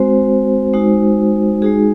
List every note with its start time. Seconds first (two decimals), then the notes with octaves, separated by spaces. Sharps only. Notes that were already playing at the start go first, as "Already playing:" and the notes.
Already playing: G#3 C4 F#4 C5
0.74 G#3 D#4 F#4
1.62 G#3 D#4 F#4 G#4